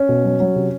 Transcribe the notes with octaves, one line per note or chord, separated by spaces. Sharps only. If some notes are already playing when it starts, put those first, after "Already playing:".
Already playing: C#4
B2
F#3
F#3
C3